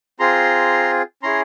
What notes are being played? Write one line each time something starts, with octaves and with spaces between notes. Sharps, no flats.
C4 F4 G#4 A#5 C6
C#4 E4 G#4 A#5 C6